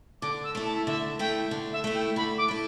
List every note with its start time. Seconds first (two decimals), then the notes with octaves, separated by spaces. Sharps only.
0.22 D3 D6
0.44 E6
0.55 A3 E4
0.65 A5
0.87 D3 E5
1.19 A3 E4 G5
1.51 D3
1.73 E5
1.84 A3 E4
1.94 G5
2.16 D3 B5
2.38 D6
2.48 A3 E4